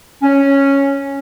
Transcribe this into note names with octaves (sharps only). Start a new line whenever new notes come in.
C#4